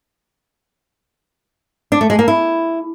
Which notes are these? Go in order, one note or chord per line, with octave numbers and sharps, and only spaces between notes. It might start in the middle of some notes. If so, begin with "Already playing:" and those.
D4
A3
G#3
A#3
E4